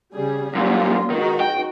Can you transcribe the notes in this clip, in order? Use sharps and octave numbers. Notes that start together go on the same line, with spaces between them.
C#3 G3 G#4
F#2 A#2 G3 A#3 F4
C#2 D#3 D#4 F#4
G5